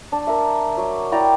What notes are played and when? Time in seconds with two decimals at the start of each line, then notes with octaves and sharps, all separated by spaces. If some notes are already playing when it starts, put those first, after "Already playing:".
0.12 D4
0.27 A#4 E5
0.77 F#3
1.12 E4 D5 G5 A#5